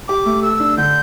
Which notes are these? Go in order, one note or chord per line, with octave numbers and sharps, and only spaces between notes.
G4 D6
A3
A4 E6
D4
D3 G6